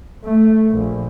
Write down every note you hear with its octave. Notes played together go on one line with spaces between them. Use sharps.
A3
A#1